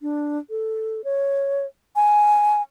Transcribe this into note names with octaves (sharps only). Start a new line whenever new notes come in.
D4
A4
C#5
G#5